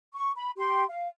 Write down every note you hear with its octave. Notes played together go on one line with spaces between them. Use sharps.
C#6
B5
G4 C6
F5